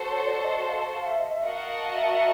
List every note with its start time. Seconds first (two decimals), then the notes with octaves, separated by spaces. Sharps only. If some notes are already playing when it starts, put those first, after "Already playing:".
Already playing: F#4 A4 C5
0.10 C#5
0.26 D5
0.44 D#5
0.69 F5
0.94 F5
1.06 E5
1.19 D#5
1.31 E5
1.43 F#4 A#4 D#5 F5 F#5 A5
1.94 E5
2.10 E5